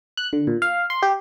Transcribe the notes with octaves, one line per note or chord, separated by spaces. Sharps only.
F#6
D3
A#2
F5
C6
G4